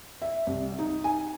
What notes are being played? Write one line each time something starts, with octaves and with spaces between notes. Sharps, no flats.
E5
C2
D#4
G#5